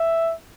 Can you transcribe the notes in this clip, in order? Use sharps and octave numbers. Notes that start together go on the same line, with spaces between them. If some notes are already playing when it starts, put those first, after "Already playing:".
Already playing: E5